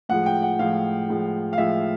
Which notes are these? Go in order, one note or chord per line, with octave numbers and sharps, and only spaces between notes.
A2 F3 G#3 F#5
G5
F#5
A2 F3 G#3 F5
A2 F3 G#3
F5
A2 F3 G#3 E5